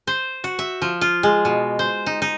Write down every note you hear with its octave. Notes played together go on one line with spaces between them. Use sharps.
C5
F#4
E5
F3
F4
G#3
B2
C5
D#4
D#4